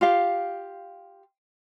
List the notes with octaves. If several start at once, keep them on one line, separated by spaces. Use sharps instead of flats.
F4 G4 F5